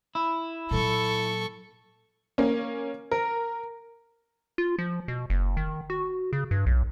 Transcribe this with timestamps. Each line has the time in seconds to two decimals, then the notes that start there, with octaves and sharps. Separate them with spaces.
0.15 E4
0.71 A#2 F#3 A4 C#6
2.38 A#3 C#4
3.11 A#4
4.58 F4
4.78 F3
5.08 B2
5.30 F#1
5.57 D#3
5.90 F#4
6.33 C#3
6.51 G2
6.66 B1